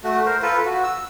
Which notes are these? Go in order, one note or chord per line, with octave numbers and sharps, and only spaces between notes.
A3 F#4
A#4 C5
F4 A4 B4
F#4
E6